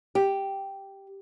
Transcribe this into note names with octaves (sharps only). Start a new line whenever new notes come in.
G4